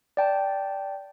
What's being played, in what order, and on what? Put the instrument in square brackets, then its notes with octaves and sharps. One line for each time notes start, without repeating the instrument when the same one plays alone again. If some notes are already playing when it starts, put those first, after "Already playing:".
[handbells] D5 G5 A5